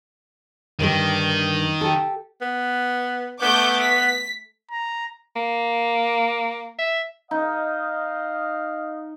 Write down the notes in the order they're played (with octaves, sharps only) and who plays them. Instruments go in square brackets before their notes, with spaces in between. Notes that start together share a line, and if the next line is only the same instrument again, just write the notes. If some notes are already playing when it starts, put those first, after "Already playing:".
[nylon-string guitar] G2 D3 G3 [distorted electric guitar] D#3
[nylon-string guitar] G4 A4
[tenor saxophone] B3
[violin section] A3 D6 G6 [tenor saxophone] B3
[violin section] B6
[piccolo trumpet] A#5
[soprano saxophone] A#3
E5
[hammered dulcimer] D#4 [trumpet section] D#5 F5